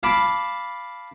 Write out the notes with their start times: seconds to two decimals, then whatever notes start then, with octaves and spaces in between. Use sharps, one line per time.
0.03 F5 A5 B5 D6